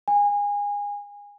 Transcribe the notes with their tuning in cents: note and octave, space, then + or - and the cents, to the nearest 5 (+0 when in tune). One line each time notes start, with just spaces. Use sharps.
G#5 -25